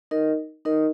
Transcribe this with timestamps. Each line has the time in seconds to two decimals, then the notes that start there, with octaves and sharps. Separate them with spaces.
0.11 D#4 A#4 D#5
0.65 D#4 A#4 D#5